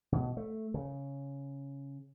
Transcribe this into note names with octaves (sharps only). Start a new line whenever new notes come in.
B2
A3
C#3